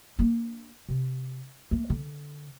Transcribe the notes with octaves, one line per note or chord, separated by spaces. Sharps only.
A#3 D4
C3
A3 A#3
D3